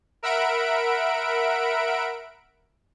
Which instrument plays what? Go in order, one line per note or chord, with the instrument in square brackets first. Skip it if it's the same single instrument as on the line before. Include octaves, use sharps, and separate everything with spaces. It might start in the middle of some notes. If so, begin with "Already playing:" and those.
[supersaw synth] A#4 E5 F#5 B5 D7